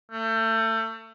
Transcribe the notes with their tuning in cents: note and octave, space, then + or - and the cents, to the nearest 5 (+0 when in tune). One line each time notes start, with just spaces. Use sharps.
A3 +30